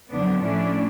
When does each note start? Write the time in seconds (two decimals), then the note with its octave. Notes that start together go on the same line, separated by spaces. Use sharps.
0.10 F2 D3 F#3 B3 D4
0.42 A2 F3 A3 C#4 D4 E4